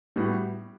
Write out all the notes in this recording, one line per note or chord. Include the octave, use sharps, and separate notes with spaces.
A2 G3 B3 F#4